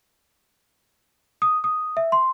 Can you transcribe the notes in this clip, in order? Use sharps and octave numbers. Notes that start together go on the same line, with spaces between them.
D#6
D#6
E5
C6